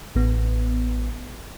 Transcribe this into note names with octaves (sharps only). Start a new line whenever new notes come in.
A1 B3